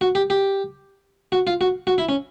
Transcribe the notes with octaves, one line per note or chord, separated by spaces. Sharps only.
F#4
G4
G4
F#4
F4
F#4
F#4
E4
C#4